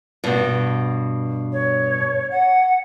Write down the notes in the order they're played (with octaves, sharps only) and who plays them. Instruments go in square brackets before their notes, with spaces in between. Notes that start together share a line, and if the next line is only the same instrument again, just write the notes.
[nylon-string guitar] G2 B2
[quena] C#5
F#5